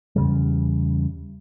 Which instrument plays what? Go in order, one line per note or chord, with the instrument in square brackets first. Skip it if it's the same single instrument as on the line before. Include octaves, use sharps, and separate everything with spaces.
[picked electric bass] E2 C#3 G3